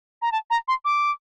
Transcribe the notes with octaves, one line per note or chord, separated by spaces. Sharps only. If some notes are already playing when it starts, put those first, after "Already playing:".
A#5
A5
A#5
C6
D6